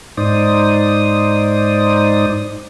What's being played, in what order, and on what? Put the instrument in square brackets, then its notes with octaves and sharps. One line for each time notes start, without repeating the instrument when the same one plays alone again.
[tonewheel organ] G#2 D#4 C5 D5 D#6